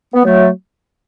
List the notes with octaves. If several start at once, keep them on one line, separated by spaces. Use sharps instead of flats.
B3
F#3 A3